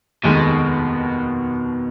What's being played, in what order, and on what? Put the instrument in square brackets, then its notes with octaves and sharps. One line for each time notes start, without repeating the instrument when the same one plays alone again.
[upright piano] F1 D#2 D#3 G#3 [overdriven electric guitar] B2